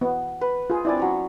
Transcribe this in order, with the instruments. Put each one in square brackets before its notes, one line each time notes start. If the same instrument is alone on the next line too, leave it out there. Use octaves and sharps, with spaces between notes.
[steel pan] B3
[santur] B4
[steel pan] F4 G#4
[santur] C4 D4 [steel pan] E4 D5 G#5
[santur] F#3 C#4 C#5